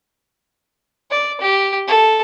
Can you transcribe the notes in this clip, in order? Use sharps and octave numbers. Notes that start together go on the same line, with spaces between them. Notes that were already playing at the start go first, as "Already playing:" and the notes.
D5
G4
A4